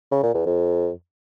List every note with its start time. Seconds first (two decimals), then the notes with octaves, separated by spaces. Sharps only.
0.12 C#3
0.23 A#2
0.35 E2
0.46 F2